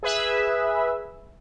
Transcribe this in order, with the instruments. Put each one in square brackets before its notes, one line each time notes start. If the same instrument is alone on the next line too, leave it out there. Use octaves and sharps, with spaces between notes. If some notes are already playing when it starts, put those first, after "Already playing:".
[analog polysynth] G#4 B4 E5